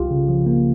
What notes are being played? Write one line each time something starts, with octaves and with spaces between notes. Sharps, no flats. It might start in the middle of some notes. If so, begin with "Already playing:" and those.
Already playing: C2 F4 G4
C#3
F3
A#3